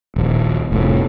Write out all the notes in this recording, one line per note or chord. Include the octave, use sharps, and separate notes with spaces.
D#1 A#1
F1 A2